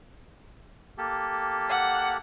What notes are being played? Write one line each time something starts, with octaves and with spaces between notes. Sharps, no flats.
A#3 G4 A4
F#5